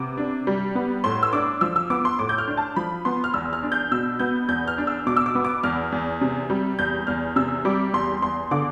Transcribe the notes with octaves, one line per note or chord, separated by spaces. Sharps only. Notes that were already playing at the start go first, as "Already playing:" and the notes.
Already playing: C3 B3 D6
D4
G3
B3
A2 C6
E6
D4 D6
F3 E6
E6
B3 D6
C6
A2 D6
G6
F6
D4
A5
F3 B5
B3 C6
F6
E2 E6
F6
D4
G6
B2 E6
B3 G6
E2 G6
F6
D4
E6
B2 D6
E6
D6
B3
D6
E2 F6
E2
C3
G3
E2 G6
E2 F6
C3 E6
G3 D6
E2 C6
E2 C6
D3 D6